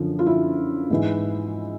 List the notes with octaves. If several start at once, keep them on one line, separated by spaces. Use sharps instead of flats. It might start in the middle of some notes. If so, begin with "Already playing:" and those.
Already playing: F#2 D3 F3
F4
E4
G#2 E3